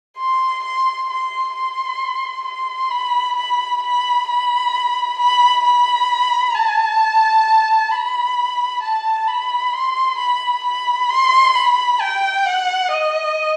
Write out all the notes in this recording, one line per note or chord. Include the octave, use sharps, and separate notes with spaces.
C6
C6
C6
C6
C6
B5
B5
B5
B5
B5
B5
A5
B5
A5
B5
C6
B5
B5
C6
B5
G5
F#5
D#5